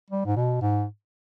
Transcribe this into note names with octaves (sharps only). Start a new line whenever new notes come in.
G3
G#2
B2
G#2